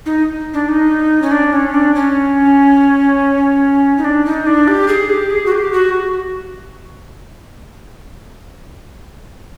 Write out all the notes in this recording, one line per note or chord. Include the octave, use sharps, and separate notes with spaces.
D#4
D4
D#4
C#4
D4
C#4
D4
C#4
D#4
D4
D#4
D4
G4
G#4
G4
G#4
F#4
G4
F#4